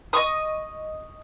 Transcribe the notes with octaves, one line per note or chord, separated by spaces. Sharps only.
D#5 C#6 D#6